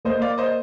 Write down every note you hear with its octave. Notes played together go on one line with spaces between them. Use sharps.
A#3 C5 D#5
D5 F5
C5 D#5